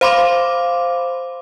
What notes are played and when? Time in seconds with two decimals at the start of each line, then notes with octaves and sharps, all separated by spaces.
0.01 C5 F5 B5 C6 D6